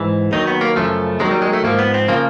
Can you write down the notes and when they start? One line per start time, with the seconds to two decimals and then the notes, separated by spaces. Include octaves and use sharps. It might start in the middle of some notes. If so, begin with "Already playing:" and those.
Already playing: G#2 E3
0.32 D#2 D#3 F#3 D#4
0.47 B3
0.61 A#3
0.76 F#2 C#3 F3 A3
1.20 D#2 D#3 F#3 G#3
1.31 G3
1.42 G#3
1.53 A3
1.64 G#2 F3 A#3
1.79 B3
1.94 C4
2.08 C#3 F3 A#3